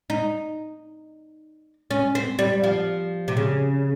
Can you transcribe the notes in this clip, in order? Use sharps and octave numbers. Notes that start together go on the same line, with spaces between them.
D#4
C#4
C4
G3
F3
C3
C#3